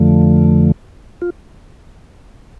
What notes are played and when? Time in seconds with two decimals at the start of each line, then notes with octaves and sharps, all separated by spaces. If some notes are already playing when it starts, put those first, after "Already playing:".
Already playing: F2 D3 F3 A3
1.22 F4